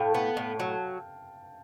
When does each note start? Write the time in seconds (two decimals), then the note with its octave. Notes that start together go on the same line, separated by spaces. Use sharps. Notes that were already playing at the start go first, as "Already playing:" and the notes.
Already playing: A2 F5 G5 A5
0.14 B3
0.37 A2
0.60 F#3